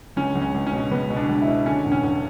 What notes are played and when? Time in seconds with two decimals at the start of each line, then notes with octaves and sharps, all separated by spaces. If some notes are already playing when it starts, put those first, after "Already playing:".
0.16 C#2 C#4
0.35 C#2
0.41 C#4
0.54 C#2
0.67 C#4
0.73 B2
0.91 C#2 B3
1.10 B2
1.17 D4
1.29 C#2
1.42 E4
1.47 B2
1.66 D3 C#4
1.85 E1
1.92 C#4
2.04 E1